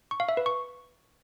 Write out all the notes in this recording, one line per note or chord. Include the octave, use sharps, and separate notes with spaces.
C#6
F5
E5
B4
C#6